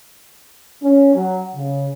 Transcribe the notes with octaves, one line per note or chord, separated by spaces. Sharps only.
C#4
F#3
C#3